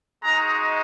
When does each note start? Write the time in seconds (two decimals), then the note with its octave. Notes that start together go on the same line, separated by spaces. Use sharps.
0.23 G#3 D#4 F#4 A#5